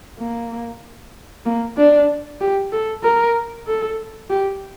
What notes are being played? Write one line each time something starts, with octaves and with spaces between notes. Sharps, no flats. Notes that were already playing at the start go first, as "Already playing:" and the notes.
A#3
A#3
D4
G4
A4
A#4
A4
G4